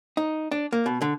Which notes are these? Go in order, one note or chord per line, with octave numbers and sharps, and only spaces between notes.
D#4
D4
A#3
B2
D3